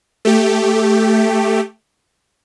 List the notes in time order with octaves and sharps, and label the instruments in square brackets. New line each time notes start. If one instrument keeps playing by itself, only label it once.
[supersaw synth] A3 G4